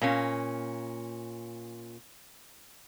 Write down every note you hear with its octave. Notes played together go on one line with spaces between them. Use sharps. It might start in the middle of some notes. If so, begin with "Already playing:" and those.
A#2 A#3 C#4